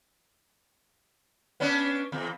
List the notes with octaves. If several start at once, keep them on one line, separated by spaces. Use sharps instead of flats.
B3 C#4 D4
E2